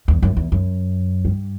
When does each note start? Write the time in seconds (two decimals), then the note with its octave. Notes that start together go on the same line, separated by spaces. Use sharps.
0.08 E2
0.22 F#2
0.36 E2
0.52 F#2
1.25 G2